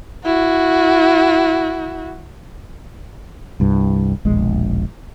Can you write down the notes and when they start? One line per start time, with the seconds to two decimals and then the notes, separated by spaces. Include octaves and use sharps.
0.25 E4 F#4
3.60 C2 G2
4.25 E1 A#1 D#2 G#3